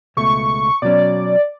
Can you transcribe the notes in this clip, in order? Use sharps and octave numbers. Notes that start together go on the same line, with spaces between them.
C#2 B2 A3 C#6
B2 F#3 C#4 D5